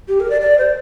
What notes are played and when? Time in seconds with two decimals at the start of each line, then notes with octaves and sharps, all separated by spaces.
0.08 G4
0.20 A#4
0.30 D5
0.41 D5
0.58 C5